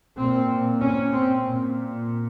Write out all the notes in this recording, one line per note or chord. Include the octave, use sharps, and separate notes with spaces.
A#2 C4
C#4
C4
A#2